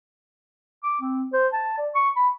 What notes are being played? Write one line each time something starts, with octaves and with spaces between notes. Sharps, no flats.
D6
C4
C5
A5
D5
C#6
B5